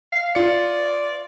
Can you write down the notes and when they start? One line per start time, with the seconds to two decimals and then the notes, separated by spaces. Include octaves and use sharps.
0.12 F5
0.35 F4 D5 C#7